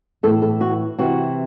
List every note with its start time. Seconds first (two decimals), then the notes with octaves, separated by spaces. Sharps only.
0.23 A2 E3 A4
0.42 A4
0.61 F#4
0.99 C3 E3 F#4